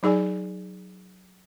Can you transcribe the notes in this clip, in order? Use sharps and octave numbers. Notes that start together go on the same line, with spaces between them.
F#3 D#4 G#4 D5 G#5